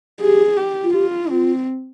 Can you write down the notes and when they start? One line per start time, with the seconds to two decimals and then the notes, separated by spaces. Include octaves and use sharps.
0.21 G4 G#4
0.57 G4
0.84 F4
0.94 F4 G4
1.30 C4 F4